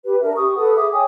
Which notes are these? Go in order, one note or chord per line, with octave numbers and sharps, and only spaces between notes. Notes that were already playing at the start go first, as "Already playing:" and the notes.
G4 B4
D4 A#4 E5
G4 C#6 D#6
A4 B4 F#5 D#6
G#4 E5 D6 D#6
C#5 G5 G#5 D#6